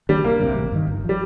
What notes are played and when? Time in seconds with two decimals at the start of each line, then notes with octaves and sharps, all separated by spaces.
0.09 D#3 G3 A#3 D4
0.24 C2 A#3
0.40 C3 D#3 G3
0.55 A1
0.72 G2 D#3
0.87 G1
1.04 F3 G3